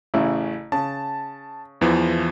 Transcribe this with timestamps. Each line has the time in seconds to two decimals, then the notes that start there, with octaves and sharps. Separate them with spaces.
0.14 A1 C#3 E4
0.72 C#3 A5
1.81 E2 E3 F3